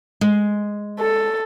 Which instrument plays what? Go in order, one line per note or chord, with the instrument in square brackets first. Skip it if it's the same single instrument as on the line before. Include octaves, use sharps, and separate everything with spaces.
[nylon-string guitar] G#3
[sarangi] A4